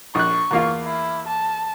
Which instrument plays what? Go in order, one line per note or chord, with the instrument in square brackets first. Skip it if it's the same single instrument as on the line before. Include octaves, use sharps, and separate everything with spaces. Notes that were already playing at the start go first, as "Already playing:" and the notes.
[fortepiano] A#1 F#6 [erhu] C#6
[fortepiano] E2 A#3 F4
[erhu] E4
A5